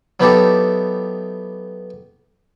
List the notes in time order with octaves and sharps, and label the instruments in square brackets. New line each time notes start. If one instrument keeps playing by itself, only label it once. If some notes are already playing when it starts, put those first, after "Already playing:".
[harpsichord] F#3 B3 D#4 E4 G4 A4